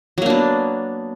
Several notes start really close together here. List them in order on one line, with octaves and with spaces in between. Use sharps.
F#3 A#3 D4 B3